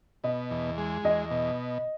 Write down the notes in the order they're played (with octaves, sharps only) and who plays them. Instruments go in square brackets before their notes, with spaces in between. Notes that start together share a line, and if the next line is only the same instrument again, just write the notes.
[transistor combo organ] B2 [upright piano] D#5
[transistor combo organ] E2
G#3
[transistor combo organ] E2 [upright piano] D#5
[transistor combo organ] B2